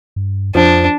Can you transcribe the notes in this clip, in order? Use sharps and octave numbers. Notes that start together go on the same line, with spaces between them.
G2
F2 F3 D4